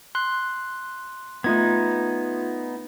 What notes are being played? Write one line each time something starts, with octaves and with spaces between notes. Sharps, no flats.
C6 F#6
A3 B3 D#4 F4 G#6